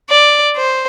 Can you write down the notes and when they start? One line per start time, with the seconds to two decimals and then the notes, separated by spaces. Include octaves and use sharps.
0.10 D5
0.56 C5